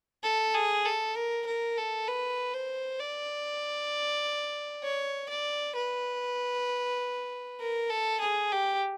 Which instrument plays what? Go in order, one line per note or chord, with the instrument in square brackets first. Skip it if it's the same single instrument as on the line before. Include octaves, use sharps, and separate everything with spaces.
[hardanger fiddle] A4
G#4
A4
A#4
A#4
A4
B4
C5
D5
C#5
D5
B4
A#4
A4
G#4
G4